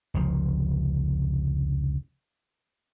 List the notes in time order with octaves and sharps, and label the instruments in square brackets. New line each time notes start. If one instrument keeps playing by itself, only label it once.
[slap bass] F1 C#2 F3